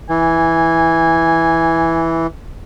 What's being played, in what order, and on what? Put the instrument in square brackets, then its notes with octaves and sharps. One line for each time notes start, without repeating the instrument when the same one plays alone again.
[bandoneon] E3 [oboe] G#5